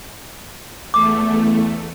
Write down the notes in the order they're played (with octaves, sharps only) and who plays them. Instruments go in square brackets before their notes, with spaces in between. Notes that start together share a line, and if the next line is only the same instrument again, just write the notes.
[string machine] E2 A3 [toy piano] D6